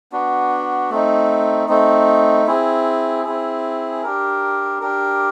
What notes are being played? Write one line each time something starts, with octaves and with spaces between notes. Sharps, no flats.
B3 D4 F#4
A3 C4 D#4
A3 C4 D#4
C4 E4 G#4
C4 E4 G#4
D4 G4 A#4
D4 G4 A#4